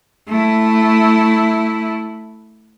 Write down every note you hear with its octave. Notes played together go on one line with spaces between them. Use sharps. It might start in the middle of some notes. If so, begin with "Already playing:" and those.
A3 E4